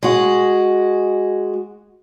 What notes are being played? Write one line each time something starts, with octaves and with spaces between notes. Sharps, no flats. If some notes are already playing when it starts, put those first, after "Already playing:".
G#3 F#4